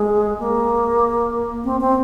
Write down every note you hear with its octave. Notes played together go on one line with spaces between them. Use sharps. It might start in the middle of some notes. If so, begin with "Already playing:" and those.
Already playing: G#3
A#3
C4
C4